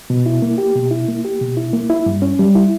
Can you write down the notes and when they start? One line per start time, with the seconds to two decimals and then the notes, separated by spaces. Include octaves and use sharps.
0.10 B2
0.26 E4
0.42 A#3
0.58 G4
0.75 B2
0.91 E4
1.08 A#3
1.25 G4
1.41 B2
1.57 E4
1.73 A#3
1.90 E4
2.06 G2
2.22 C#4
2.39 G3
2.55 E4